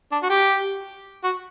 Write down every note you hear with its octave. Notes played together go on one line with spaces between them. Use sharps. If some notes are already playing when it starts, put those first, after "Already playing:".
D4
F#4
G4
F#4